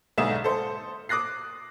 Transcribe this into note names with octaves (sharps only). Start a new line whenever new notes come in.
B1 G#2 D3 E5 D#6 E7
A4 C5
D6 D#6 F#6 A#6 C7